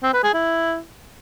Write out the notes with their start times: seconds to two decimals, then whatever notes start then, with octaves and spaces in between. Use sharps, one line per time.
0.03 C4
0.13 B4
0.24 G#4
0.34 E4